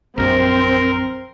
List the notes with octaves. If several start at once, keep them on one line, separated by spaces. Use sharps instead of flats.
A#1 F#2 C4 A#4 C6